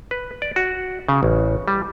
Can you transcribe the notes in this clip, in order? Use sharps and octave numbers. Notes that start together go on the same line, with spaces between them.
B4
D5
F#4
C#3
A1
G3